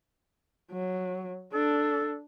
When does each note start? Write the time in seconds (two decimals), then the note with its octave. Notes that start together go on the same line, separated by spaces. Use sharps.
0.71 F#3
1.53 D4 A4